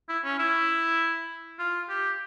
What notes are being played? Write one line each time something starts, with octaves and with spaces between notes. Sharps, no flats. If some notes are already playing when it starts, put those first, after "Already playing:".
E4
C#4
E4
F4
G4